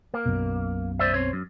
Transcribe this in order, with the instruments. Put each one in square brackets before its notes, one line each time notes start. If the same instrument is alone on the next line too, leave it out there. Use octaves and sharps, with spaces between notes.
[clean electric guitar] A#3
[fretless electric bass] B1 F#2 B2
[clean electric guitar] C5 D5 E5
C4 C#5
F#2